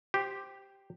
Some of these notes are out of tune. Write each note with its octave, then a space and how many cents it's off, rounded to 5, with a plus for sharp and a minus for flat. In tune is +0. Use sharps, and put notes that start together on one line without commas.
G4 +0 C5 +0